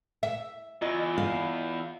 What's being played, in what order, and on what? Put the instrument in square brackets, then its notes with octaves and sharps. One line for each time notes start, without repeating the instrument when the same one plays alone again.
[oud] E5
[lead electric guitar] E2 [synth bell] F4 D#5
[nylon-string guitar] F5